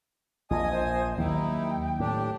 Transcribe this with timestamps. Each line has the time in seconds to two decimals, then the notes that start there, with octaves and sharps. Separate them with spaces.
0.51 A#1 F4 D#5 G#5 D#6
0.72 C5
1.18 D#2 D#3 F#3 A#3 D#4 E4 G5
2.00 A2 D4 G4